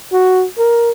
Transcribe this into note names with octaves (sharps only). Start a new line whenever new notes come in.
F#4
A#4